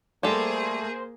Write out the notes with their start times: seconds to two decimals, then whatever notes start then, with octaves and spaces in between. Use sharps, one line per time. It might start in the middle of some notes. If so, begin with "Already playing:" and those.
0.23 G3 A3 A#3 G#4 A4 C5